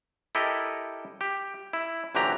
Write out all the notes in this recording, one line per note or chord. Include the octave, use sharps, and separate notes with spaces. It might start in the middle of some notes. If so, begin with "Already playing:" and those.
E4 G4 A4 A#4 D#5
G4
E4
A#1 D3 E3 F#3 G4 A#5